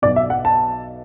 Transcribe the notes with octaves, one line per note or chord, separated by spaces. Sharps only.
B1 B2 D5
E5
F#5
A5